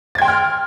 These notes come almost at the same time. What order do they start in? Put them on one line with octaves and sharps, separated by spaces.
A6 G#6 G5 C6 F6